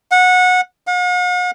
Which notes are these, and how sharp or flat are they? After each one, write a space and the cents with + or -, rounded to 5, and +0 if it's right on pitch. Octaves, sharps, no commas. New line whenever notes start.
F#5 -20
F#5 -45